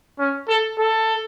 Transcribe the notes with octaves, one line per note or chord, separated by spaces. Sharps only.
C#4
A4
A4